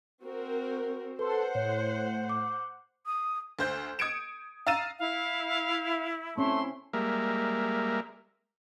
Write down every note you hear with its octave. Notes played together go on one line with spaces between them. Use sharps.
C4 F#4 A#4
A4 B4 C5 F#5 C6
A2 C#5
D6
D#6
D2 C5 G6
D#6 G#6 C#7 D7 E7
F5 A#5 E6 A6 D#7 E7
E4 F5
A3 C4 C#4 C6
G3 G#3 A#3 A#4 E5